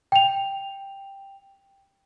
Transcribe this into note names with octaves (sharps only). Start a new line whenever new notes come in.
G5 F7